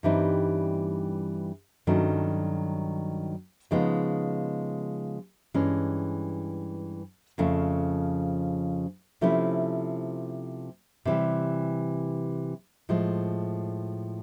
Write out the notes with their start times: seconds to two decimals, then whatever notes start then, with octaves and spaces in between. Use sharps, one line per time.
0.03 G2 E3 G3 C4 D#4
1.87 G2 D#3 F#3 A3 C#4
3.71 C#3 F3 G#3 B3 D#4
5.54 G2 E3 G#3 C#4
7.38 F2 C#3 F3 A3
9.21 C3 F3 A3 C#4 E4
11.05 C3 E3 G3
12.89 A2 F3 G#3